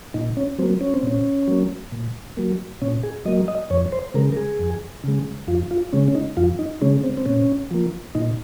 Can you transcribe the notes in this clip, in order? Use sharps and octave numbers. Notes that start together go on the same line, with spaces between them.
A#2 D#4
C#4
F#3 A#3 C4
C#4
C4
A#2 C#4
F#3 A#3
A#2
F#3 A#3
A#2 C#4
G#4
F#3 A#3 D#5
D#5
F2 C#5
C5
C#3 G#3 A#4
A#4
G#4
F2
C#3 G#3
F2 F4
F4
C#3 G#3 C#4
C#4
D#4
F2 F4
D#4
C#3 G#3 C#4
C4
C4
A#2 C#4
F3 A#3
A#2 D#4